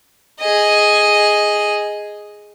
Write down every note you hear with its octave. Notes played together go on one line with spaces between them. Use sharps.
G#4 D#5